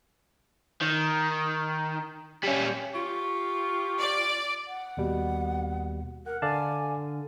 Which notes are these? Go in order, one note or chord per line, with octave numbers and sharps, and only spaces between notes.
D#3
G3 C#4
F4 G4 C#6
D5
F#5
D#2 B2 G3
A#4 F#5
D3 D5 F5 G#5 A5